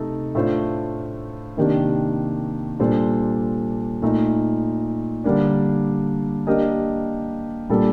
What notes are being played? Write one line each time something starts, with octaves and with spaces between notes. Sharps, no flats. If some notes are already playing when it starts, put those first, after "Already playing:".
Already playing: C3 A3 D#4 A4
A2 A3 D4 F4 C5
C3 D#3 A#3 D4 G4
A#2 G3 D4 A4 C5
A#2 A3 D#4
D3 G3 A#3 D4
A#3 D4 G4 A#4 D#5
A#2 G3 A#3 D4 A4